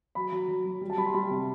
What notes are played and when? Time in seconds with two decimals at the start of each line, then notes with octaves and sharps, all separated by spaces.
0.15 F#3 B5
0.32 F#3
0.48 F#3
0.65 F#3
0.81 G3
0.90 A5
0.98 G3 B5
1.06 C6
1.14 G3 B5
1.30 C3